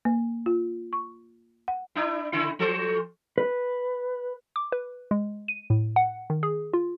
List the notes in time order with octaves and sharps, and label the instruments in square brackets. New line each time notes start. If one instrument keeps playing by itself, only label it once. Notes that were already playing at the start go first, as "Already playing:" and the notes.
[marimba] A#3
F4
C#6
F#5
[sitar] D4 E4
C#3 E4
F3 A4 C5
[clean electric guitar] B4
[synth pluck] D6
B4
G#3
D#7
A2
F#5
D#3
G#4
F4